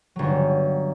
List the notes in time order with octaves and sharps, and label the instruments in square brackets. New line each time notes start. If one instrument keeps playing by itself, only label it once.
[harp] G1 F#3